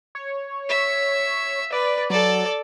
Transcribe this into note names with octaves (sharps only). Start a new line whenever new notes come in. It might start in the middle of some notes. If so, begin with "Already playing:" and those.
C#5
E5
B4 D5
F#3 A4 D5